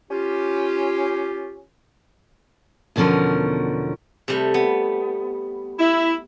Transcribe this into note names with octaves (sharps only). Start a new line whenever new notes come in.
C#4 F4 G4
E2 B2 D3 F3 C#4 A#4
C3 G3 A3
B3
E4